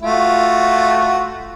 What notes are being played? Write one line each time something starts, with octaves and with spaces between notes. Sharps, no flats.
A3 F4 F#4